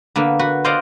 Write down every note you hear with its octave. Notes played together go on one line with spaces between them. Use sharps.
D3 A#3 B3
F#4 B4
F4 C5 D5 D#5 F5 F#5